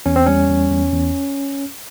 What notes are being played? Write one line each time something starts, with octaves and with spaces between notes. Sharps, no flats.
E2 C#4
C4
G3 C#4
E2
E2
E2